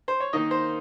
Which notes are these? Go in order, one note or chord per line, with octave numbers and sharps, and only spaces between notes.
C5
C#5
D#3 A#3 D#4 D#5
C5